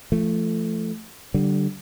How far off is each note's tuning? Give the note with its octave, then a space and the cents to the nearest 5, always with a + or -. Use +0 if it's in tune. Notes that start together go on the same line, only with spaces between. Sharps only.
F3 -35 A3 +0
D3 +0 G3 -30